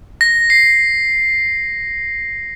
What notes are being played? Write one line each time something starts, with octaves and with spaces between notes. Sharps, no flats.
A#6
C7